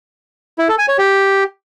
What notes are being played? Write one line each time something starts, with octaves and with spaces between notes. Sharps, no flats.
E4
A4
G#5
C#5
G4